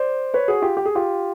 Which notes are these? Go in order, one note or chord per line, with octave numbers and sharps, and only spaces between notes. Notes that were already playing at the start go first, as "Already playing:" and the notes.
Already playing: C5 D5
B4 C#5
F#4 G#4
F4 G4
G4
G#4
F4 G4